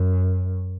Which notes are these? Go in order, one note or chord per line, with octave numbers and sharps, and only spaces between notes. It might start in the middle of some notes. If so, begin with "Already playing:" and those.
Already playing: F#2